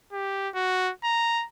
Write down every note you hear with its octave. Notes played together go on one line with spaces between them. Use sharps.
G4
F#4
A#5